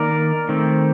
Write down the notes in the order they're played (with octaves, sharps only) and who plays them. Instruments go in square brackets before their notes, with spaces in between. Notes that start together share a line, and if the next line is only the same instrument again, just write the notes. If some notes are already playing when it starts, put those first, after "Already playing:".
Already playing: [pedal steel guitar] D#3 A#3 A#4 D5
D#3 A3 C4